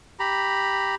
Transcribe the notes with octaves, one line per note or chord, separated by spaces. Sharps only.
G4 A#5 B5